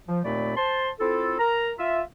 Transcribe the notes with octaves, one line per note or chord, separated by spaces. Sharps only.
F3
D#2 A#2 A3 C4 D5 B5
C5 A5 C6
C4 E4 F4 A4
A#4 A#5
F4 E5